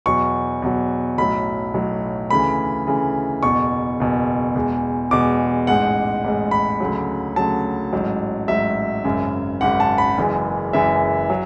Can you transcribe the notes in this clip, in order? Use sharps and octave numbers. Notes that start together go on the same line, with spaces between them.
E2 B2 F#3 C#6
E2 B2 F#3
B1 A2 F#3 B5
B1 A2 F#3
D2 C#3 E3 B5
D2 C#3 E3
F#1 E2 B2 C#6
F#1 E2 B2
E2 B2 G#3
E2 B2 G#3 D6
A1 G#2 G#3 F#5
A1 G#2 G#3
B5
D2 C#3 F#3
D2 C#3 F#3 A5
A1 G#2 F#3
A1 G#2 F#3 E5
G#1 F#2 C#3
G#1 F#2 C#3 F#5
A5
B5
F#1 F#2 E3 G#3
F#1 F#2 E3 G#3 E5
F#3